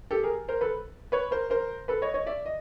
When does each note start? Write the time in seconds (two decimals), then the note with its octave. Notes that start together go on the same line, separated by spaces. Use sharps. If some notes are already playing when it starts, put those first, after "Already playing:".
0.11 G4 A4
0.23 G#4 A#4
0.48 A#4 C5
0.61 A4 B4
1.12 B4 C#5
1.31 A#4 C5
1.50 A#4 C5
1.88 A4 B4
2.02 C#5 D#5
2.14 C#5 D#5
2.26 D5 E5
2.46 D#5